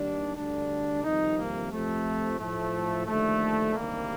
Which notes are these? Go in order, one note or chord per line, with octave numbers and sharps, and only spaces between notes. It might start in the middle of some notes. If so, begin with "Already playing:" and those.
Already playing: D#2 D#3 G3 D4
D2 D3 G3 D4
F2 C3 D#3 G3 D#4
A#3
F2 C3 F3 A3
A2 F3 A3
D#2 D3 F3 A3
D2 C3 D#3 G3 A#3